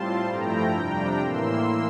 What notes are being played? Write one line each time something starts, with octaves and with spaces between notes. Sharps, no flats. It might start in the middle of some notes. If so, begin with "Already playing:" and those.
Already playing: A2 G3 C4 F4 A5 C6
G2 F3 A3 E4 G5 A#5
F2 C3 G3 D4 G5 A#5
A2 E3 A#3 C6 E6